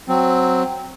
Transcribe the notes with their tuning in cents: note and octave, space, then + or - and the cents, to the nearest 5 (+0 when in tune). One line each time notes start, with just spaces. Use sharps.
F#3 +0 C4 +0